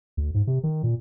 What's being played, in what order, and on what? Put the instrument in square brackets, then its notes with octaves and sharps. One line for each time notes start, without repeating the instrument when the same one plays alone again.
[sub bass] D2
G#2
C3
D#3
A#2